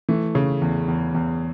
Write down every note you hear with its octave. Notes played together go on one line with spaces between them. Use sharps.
E3 A3
C#3
E2
E2
E2